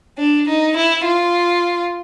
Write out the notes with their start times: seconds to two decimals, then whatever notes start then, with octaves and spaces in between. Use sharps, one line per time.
0.18 D4
0.48 D#4
0.76 E4
1.05 F4